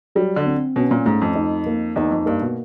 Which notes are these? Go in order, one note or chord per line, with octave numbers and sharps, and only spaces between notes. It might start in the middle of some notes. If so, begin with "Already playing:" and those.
F#3 G3
D3
C4
B2 C#4
A#2
G#2 A3
F2
D#4
A#3
E2 D#4
F2
G2 A#3
B2